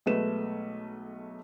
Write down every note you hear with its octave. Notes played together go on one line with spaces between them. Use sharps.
B1 G#3 A3 B4 E7